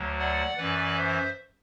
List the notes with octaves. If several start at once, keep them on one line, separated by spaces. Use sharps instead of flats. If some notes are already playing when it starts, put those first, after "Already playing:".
Already playing: D2 D3 F#3
D5 F#5
F#2 E3 B4 D5
C5 E5